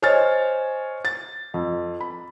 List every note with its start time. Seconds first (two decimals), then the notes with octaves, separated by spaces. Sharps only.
0.02 C5 C#5 D#5 G#5 F6 A6
1.05 A6
1.54 F2
2.00 B5